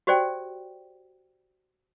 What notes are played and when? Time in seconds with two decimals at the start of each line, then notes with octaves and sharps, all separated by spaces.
0.07 F#4 G4 C5 D5 G5